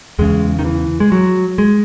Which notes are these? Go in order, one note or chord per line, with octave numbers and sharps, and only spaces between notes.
E2 C#3 G#3
D#3
E3
G#3
F#3
G#3